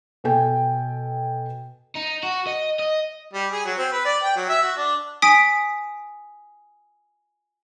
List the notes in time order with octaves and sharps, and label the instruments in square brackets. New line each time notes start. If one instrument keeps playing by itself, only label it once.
[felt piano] B2 B3 A4 G5 G#5
[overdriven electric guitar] D#4
F#4
D#5
D#5
[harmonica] G3
G#4
F#3
C4
B4
D5
G5
F#3
E5
F#4
D4
[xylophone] G#5 D#6 B6 D7